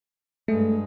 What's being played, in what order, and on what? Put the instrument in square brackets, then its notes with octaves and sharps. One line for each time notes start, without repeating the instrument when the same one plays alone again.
[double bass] G2 G#3 [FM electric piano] A3